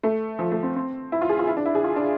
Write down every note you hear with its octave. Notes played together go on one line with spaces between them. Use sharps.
A3
F3
A3
C4
C4
E4
F4
G#4
F4
E4
D4
E4
G#4
F4
D4